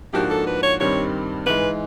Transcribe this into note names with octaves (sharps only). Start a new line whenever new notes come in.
G#2 F3 A#3 D4 F#4 G4
A4
B4
C#5
G2 D#3 G3 C4 C#5
G#2 E3 G#3 B4